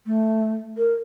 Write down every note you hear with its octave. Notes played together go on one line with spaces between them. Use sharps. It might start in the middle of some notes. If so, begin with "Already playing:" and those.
A3
A#4